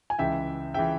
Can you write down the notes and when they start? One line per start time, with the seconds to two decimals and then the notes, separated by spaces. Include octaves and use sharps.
0.10 G#5
0.19 C#2 C#3 E3 E5 G5
0.74 C#3 E3 E5 G5